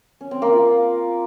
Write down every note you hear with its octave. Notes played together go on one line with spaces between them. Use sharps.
C#4
C4
A#3
F4